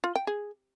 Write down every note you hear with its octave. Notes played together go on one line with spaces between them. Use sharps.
F4
G5
G#4